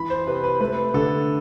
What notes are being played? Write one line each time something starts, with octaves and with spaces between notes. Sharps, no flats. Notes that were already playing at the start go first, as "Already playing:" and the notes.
Already playing: E3 B5
C5
C3 B4
B4
A3 B4
D3 A4